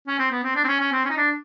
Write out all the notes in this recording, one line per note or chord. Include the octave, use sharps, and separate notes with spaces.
C#4
C4
B3
C4
D4
C4
C#4
C#4
C4
C#4
D#4
D4